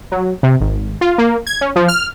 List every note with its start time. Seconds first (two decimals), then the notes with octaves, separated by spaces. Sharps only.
0.12 F#3
0.43 C3
0.60 G#1
1.01 F4
1.18 A#3
1.47 G#6
1.61 C#4
1.76 F3
1.88 F6